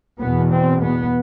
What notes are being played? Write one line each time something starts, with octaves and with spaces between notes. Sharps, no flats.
E2 B2 B3
C4
B3